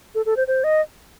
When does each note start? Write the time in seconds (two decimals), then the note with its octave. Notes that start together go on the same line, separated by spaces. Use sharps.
0.15 A4
0.26 A4
0.37 C5
0.47 C5
0.64 D#5